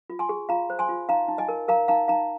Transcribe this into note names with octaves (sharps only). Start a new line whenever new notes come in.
F4
G#5 C6
G#4
F4 F5 A#5
C5
G#5 C6
F4
D#4 F5 A#5
D#4
D#5 G#5
A#4
A#4 F5 A#5
D#4 F5 A#5
D#4 F5 A#5